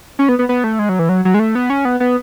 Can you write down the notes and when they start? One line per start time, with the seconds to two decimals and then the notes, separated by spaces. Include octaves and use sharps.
0.19 C#4
0.29 B3
0.39 B3
0.49 B3
0.64 A3
0.79 G#3
0.89 F#3
0.99 E3
1.09 F#3
1.25 F#3
1.34 G#3
1.39 A3
1.55 B3
1.70 C#4
1.85 B3
2.00 B3